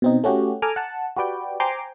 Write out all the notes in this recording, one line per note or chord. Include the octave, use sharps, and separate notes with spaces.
B2 C4 D#4
A3 C#4 F#4 G4
A4 G#5 A#5 D6 F6
F#5 A5
F#4 G4 B4 D5 G5
C5 G5 G#5 A#5 C6 D6